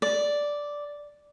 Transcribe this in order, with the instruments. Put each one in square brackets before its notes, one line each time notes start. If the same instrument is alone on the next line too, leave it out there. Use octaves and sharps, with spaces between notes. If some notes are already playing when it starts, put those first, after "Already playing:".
[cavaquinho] D5